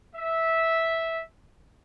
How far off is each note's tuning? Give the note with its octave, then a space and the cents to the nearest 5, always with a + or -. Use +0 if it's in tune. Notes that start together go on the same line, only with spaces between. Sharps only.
E5 -10